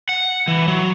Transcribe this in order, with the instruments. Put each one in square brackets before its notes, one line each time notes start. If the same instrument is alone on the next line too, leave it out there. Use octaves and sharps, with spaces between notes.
[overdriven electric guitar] F#5
E3
F#3